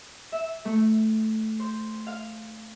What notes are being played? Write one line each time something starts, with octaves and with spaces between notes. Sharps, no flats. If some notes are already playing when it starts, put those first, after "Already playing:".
E5
A3
C5
F5